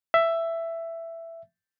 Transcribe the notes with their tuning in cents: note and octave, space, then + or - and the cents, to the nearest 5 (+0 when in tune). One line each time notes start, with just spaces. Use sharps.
E5 +10